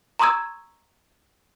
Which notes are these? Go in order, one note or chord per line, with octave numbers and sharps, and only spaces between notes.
A#5 C6 C#6 D#6 E6 G#6